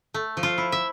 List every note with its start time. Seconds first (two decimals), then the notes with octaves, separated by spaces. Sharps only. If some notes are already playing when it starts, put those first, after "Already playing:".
0.14 A3
0.37 F3
0.43 F4
0.58 E4
0.72 E5